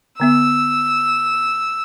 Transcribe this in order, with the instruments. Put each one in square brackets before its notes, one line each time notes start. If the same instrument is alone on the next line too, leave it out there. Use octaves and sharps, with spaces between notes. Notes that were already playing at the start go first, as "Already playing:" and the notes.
[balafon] D3 B3 E5 [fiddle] E6